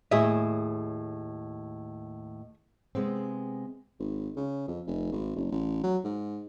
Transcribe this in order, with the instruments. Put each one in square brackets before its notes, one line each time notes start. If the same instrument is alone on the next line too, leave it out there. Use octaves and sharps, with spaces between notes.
[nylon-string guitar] D#2 A2 D#5 [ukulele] G#4 E5
[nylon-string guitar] C3 G#3 B3 C4
[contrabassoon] G#1
C#3
F2
F1
G#1
F#1
A1
F#3
G#2